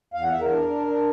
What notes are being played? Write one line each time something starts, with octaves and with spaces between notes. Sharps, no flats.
E2 F5
F#5
E2 E5
A#4
D4
D4
D4